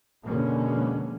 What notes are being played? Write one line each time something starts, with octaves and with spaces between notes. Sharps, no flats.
F2 B2 D3 G#3 A#3 C#4